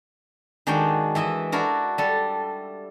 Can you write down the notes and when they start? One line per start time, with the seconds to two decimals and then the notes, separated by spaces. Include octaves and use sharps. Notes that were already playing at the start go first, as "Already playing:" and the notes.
0.67 D#3 G#3 D4 F#4 G5
1.15 E3 E4 D#5 E5
1.52 D4 E4 F#4 A#4
1.98 G3 A4